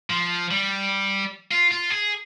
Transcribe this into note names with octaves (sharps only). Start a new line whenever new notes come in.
F3
G3
F4
F4
G#4